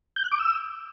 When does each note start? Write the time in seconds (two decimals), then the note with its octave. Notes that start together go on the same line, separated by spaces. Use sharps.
0.16 G6
0.24 F#6
0.32 D6
0.39 E6